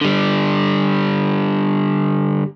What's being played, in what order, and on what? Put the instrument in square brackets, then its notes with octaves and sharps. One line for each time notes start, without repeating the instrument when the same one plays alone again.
[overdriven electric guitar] D3 G3